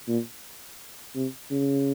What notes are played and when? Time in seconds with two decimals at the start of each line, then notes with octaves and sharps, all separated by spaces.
0.08 A#2
1.15 C3
1.51 C#3